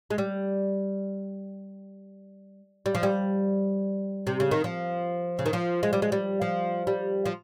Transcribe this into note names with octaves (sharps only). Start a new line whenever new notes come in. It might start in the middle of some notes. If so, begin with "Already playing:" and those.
G#3
G3
G3
F3
G3
C3
C#3
D#3
F3
C#3
D#3
F3
G#3
G3
G#3
G3
F3
G3
F3